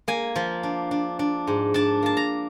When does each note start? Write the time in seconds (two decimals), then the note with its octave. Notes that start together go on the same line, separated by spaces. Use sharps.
0.08 A#3 G#5
0.36 F3
0.63 D4
0.91 D4
1.19 D4
1.47 G#2
1.74 D4 A5
2.02 A#3 A5
2.17 A#5